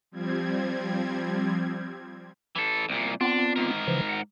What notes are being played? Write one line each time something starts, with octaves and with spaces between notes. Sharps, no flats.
F3 G3 C4 G#6
E3 A4
C2 A#2
B3 C4 D4 F4
G#2 A#4
C#3 E3 F3
F#5